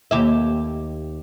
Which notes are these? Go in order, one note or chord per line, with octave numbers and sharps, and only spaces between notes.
D#2 G4 E5